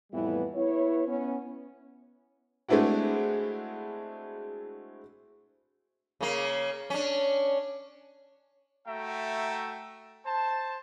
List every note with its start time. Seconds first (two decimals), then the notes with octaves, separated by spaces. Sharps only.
0.11 F2 A2 E3 G3 B3 E4
0.54 B3 E4 C#5
1.06 B3 C#4
2.69 G#3 A3 C4 D4 E4 F#4
6.21 C#3 A#3
6.90 C#4 D4
8.87 A3 F#4 E5 G5 A#5
10.26 C5 A5